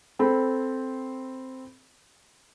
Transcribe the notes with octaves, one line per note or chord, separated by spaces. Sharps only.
C4 A4 B5